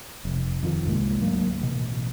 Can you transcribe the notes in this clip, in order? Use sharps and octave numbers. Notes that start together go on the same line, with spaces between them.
F1
F2 D#3 F3
C2 G#2 G#3 A#3
D2 F#3 A#3
A1 B2